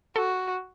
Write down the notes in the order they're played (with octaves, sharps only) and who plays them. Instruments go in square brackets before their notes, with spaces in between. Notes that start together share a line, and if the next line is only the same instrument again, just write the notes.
[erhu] F#4 [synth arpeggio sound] A4